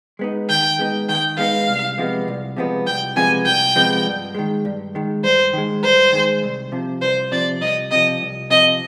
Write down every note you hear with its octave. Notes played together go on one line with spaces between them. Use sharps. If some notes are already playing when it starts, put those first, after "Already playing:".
G#3 B3 D#4
D#3 G5
G#3 B3 D#4
D#3 G5
G#3 B3 D#4 F5
C2
C3 F3 G#3 B3
C2
C3 F3 G#3 B3
C2 G5
C3 F3 G#3 B3 G#5
C2 G5
C3 F3 G#3 B3
G2
D#3 G#3
G2
D#3 G#3
G2 C5
D#3 G#3
G2 C5
D#3 G#3
C2
C3 F3
C2 C5
C3 F3 D5
C2 D#5
C3 F3 D#5
C2
C3 F3 D#5